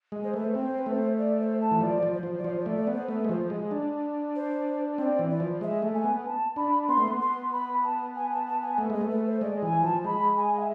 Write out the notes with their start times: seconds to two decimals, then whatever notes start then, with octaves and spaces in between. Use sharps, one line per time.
0.12 G#3
0.23 C5
0.33 A3 B4
0.44 C5
0.55 C4 C5
0.78 B4
0.86 A3 C5
1.18 D5
1.39 C5
1.60 A5
1.71 E3
1.81 F3 D5
2.03 F3
2.13 C5
2.23 F3
2.37 D5
2.44 F3 C5
2.60 D5
2.66 A3
2.76 D5
2.87 B3
2.92 C5
3.08 A3 B4
3.25 G#3
3.29 F3 C5
3.50 G#3
3.71 D4
4.35 C5
4.98 C4 D5
5.19 E3
5.30 D5
5.40 F3
5.61 G#3 E5
5.82 A3
5.93 G#5
6.04 B3
6.25 A5
6.56 D4 B5
6.88 B3 C6
6.98 A3
7.08 B3
7.20 C6
7.52 B5
7.83 A5
8.15 G#5
8.31 A5
8.46 A5
8.62 G#5
8.78 A3
8.90 G#3 B4
9.01 A3
9.10 B4
9.26 C5
9.41 G#3 D5
9.62 E3 G#5
9.83 F3 A5
10.04 G#3 B5
10.36 G#5
10.58 E5